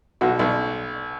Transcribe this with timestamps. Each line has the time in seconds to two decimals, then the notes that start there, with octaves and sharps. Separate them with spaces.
0.21 B1 F#4
0.39 B1